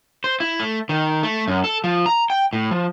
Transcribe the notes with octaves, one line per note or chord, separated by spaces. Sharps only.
C5
E4
A3
D#3
A3
F#2
A4
F3
A#5
G5
A2
F3